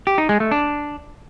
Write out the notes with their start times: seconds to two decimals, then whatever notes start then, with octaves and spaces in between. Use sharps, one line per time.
0.07 G4
0.18 D#4
0.29 G#3
0.40 A3
0.51 D4